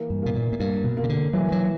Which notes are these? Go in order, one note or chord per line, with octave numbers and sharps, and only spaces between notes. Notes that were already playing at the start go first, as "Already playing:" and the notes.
Already playing: E3 A#3
G2
B2 A#3
A#2
A#2
G2 A#3
B2
A#3
C#3
D3
E3 F#3
F#3